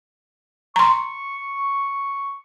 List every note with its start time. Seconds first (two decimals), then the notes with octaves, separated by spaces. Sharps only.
0.76 A#5 C6 C#6